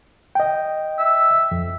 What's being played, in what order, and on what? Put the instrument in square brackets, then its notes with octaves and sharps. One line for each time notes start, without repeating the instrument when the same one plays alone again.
[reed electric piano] D#5 G5
[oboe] E5
[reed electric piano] F2